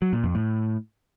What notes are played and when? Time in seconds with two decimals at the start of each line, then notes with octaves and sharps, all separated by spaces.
0.02 F#3
0.13 A#2
0.24 F2
0.35 A2